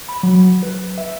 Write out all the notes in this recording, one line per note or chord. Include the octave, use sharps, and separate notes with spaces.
B5
F#3
B4
E5